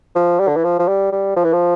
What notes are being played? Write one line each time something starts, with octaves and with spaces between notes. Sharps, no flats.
F3
G3
D3
E3
F3
F3
G3
G3
F3
E3
F3